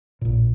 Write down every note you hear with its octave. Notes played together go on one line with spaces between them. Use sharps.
A#1 A#2